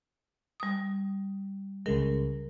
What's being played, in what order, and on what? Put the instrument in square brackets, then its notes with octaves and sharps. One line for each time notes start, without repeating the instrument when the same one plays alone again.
[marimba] G3 D#6
[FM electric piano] C#2 C#3 G#3 [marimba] A#4